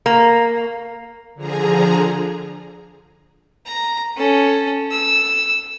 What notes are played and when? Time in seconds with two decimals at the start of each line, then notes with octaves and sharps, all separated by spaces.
0.06 A#3
1.35 D3 F3 G#4 A#5
3.66 A#5
4.17 C#4 A4
4.91 E6